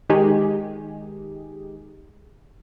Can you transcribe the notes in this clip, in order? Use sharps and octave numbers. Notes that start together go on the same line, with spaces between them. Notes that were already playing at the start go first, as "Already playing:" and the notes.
D#3 G#3 D#4 G4 G#4